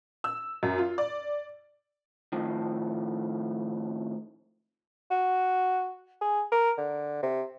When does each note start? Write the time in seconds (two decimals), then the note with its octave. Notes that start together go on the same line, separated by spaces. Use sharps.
0.24 E6
0.63 F#2
0.78 F4
0.98 D5
2.32 A2 D#3 F3
5.11 F#4
6.21 G#4
6.51 A#4
6.77 D3
7.22 C3